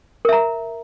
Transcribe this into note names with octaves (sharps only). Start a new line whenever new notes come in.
A#4 E5 A#5